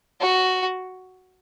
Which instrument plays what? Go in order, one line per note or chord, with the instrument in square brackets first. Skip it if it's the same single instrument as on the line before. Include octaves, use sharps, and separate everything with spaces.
[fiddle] F#4